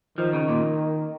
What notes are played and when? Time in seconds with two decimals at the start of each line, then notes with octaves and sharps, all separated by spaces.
0.18 D#3 F3
0.33 C#3
0.49 A#2